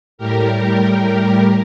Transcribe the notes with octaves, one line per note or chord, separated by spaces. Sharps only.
A2 G3 G4 A#4